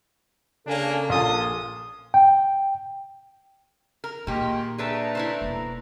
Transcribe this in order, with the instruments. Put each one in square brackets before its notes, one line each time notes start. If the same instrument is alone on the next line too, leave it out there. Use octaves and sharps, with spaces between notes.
[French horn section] C#3 A4 [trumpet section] A#3 D4 G#5
[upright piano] A#1 A#2 A#3 [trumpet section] A5 C6 D#6
[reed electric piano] G5
[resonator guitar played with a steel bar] A#4
[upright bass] A#2 [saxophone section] D#3 G#3 [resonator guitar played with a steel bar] A#3 G4 [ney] C6
[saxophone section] D#3 A3 D4 [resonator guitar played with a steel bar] G#4 B4 A5 [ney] A#5
[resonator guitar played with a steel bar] E4 B4 C5 [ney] A#5
[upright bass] E1 A#3